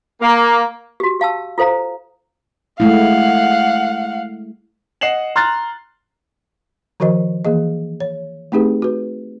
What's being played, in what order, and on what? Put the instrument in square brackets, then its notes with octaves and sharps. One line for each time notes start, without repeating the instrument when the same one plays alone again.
[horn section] A#3
[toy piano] F#4 G4
G4 F5 A5 E6
F4 A4 C5 F5 A#5
[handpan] G#3 A3 E4 [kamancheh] F5 F#5
[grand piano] D#5 F#5 C7 E7 F#7
A#5 C6 F6 F#6 A6
[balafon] D#3 F3 F#4 A#4 C5 D#5
E3 A#3 G#4 D#5
C#5
A3 C4 D#4 G4 G#4 B4
F#4 B4